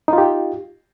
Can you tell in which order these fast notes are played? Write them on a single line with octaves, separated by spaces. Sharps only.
D#4 F4 G4